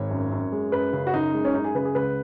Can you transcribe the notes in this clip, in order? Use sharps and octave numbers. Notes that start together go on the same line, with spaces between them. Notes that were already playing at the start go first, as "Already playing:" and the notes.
Already playing: G#1 C#5
F#2
F#2
G#3
F#2 B4
C#3
F#4
F#2 D#4
G#3
C#4
F#2 D#4
G#4
C#3 B4
G#4
C#2 B4